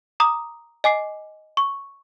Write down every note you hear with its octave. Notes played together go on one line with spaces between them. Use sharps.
A#5 D6 D#6
D#5 G#5 D6 C7
C#6